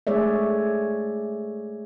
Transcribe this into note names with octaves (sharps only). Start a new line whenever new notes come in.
G#3 A3 G#4 C#5 D5 E5